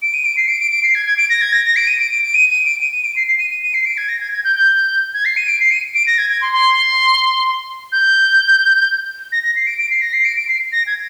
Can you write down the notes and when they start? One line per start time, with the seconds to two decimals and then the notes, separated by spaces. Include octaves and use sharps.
0.02 D7
0.14 D#7
0.25 D7
0.37 C7
0.48 D7
0.60 D7
0.71 D7
0.83 C7
0.95 G#6
1.06 G#6
1.18 D7
1.30 A#6
1.41 G#6
1.53 A#6
1.65 A#6
1.76 D7
1.87 D#7
2.00 D7
2.11 D7
2.23 D7
2.34 D#7
2.50 D#7
2.66 D7
2.81 D#7
2.93 D#7
3.04 D7
3.16 C7
3.27 C7
3.39 D#7
3.51 D#7
3.63 D#7
3.74 C7
3.86 D7
3.97 G#6
4.09 A#6
4.21 G#6
4.32 G#6
4.44 G6
4.56 G6
5.14 G#6
5.25 C7
5.37 D#7
5.48 D7
5.60 C7
5.71 D#7
5.95 D7
6.07 A#6
6.18 G#6
6.30 G#6
6.41 C6
6.52 C6
7.92 G6
9.32 A#6
9.43 A#6
9.56 C7
9.67 D7
9.78 D7
9.91 C7
10.02 A#6
10.13 C7
10.25 D7
10.37 D7
10.48 C7
10.72 A#6
10.87 G#6